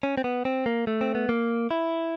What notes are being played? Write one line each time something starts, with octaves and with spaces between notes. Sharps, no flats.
C#4
C4
B3
C4
A#3
A3
C4
B3
A#3
E4